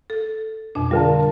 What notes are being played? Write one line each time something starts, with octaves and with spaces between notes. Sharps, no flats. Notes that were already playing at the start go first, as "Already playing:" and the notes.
A4
F2 B2 D4
D3 G3 F4 A#4 A5